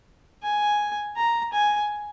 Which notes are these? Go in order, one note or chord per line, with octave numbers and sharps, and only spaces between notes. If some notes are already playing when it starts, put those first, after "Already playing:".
G#5
A#5
G#5